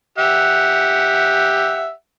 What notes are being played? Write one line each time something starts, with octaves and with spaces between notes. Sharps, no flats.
G4 E5 F#5